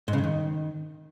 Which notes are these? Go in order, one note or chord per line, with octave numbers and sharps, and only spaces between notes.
G#2
C#3
G2
D#3